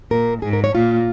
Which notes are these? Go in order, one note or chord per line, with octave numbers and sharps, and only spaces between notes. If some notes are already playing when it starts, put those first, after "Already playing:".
A#2 A#4
G#2 G#4
A#4
C#5
A#2 F4